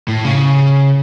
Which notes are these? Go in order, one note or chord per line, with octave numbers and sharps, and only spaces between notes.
A2
C#3